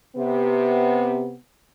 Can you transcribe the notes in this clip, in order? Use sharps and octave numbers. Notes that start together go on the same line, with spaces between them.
C3 B3